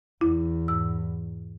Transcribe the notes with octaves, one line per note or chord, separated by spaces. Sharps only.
E2 E4
G#2 E6